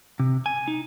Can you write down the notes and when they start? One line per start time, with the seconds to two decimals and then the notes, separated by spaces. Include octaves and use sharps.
0.20 C3
0.46 G#5
0.68 D#4